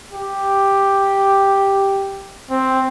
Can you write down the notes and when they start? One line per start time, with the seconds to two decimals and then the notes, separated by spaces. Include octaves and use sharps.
0.12 G4
2.50 C4